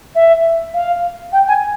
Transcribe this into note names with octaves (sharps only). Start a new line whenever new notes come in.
E5
F5
G5
G#5